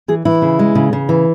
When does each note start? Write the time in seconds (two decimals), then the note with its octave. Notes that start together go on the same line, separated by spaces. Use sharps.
0.08 E3 G#4
0.25 E3 E4
0.42 C#3
0.59 G#3
0.75 C#3
0.93 C#3
1.09 E3